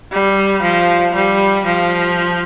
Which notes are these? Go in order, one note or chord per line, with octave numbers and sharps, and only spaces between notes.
G3
F3
G3
F3